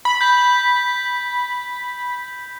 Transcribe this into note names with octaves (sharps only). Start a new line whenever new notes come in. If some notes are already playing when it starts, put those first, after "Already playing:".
B5
G6 B6